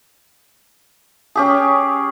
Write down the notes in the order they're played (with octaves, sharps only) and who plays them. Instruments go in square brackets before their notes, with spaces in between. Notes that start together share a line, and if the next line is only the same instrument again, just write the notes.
[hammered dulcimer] C#4 G4 G#4